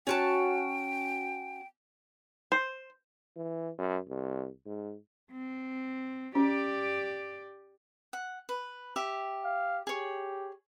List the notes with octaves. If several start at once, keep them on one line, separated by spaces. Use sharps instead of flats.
C#4 F#4 G5 A5
C5
E3
F#2
C2
G#2
C4
C#4 G4 D5
F#5
B4
G4 E5
F5
G4 G#4 C#5